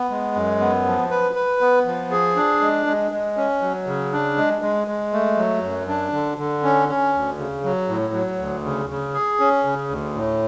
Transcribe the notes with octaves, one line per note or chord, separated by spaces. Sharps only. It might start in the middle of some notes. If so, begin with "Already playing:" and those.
Already playing: B3
G#3
F#2
B3
F3
B4
B4
B3
F3
G#4
D4
G#3
G#3
G#3
C#4
F#3
C#3
D4
G#3
G#3
G#3
A3
F#3
F#2
D4
D3
D3
C#4
C#4
D2
C#3
F#3
A2
F#3
D2
C#3
C#3
G#4
C#4
C#3
D2
A2